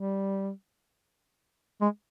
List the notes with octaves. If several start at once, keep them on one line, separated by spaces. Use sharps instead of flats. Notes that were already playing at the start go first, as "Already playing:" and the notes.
Already playing: G3
G#3